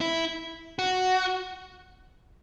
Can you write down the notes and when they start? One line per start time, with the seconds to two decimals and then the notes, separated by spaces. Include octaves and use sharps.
0.01 E4
0.79 F#4